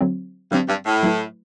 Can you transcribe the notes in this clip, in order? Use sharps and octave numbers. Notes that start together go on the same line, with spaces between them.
D3 F#3 C4
G2 D3 F#3 C4
G2
A2
F#3 A3 E4 B4